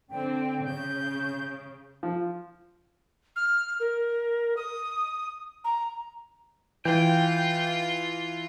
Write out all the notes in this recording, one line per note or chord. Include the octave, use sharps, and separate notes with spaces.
D3 C4 G5
C#3 G6
F3
F6
A#4
D#6
A#5
E3 F4 G5